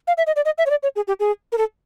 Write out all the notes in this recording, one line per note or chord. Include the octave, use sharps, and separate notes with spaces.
F5
E5
D#5
D5
D#5
E5
C#5
D5
C#5
G#4
G4
G#4
A#4
A4